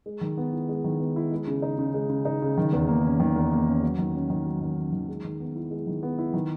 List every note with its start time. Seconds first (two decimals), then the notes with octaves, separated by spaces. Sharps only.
0.06 G#3
0.21 D#3
0.37 B3
0.53 E4
0.69 G#3
0.84 D#3
1.00 B3
1.16 E4
1.32 G#3
1.47 C#3
1.62 D#4
1.78 C#3
1.94 G#3
2.10 C#3
2.25 D#4
2.42 C#3
2.58 D#3
2.73 E2
2.89 A#3
3.05 C#4
3.20 D#3
3.36 E2
3.52 A#3
3.67 C#4
3.82 F#3
3.98 D#3
4.15 C#4
4.30 D#3
4.46 F#3
4.61 D#3
4.77 C#4
4.92 D#3
5.09 G#3
5.24 D#3
5.40 B3
5.56 E4
5.71 G#3
5.87 D#3
6.03 B3
6.18 E4
6.34 D#3